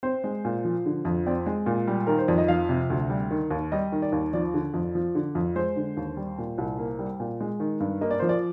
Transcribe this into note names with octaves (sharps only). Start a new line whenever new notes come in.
C4 C5
G#3
A#2
F3
D3
F2
C4 D5
G#3
A#2
G3
D#3 A#4
C5
F2 D5
D#5
F3 F5
C3
D2
G3
D#3
D#2
G3 D#5
D#3
D5
D#2
F3 D5
D3
F2
F3
D3
F2
G#3 C5
D3
D#2
G3
A#2
C2
A#3
G3
A#2
G#3
D#3
G2
A#3 D#5
D5
F3 C5
D5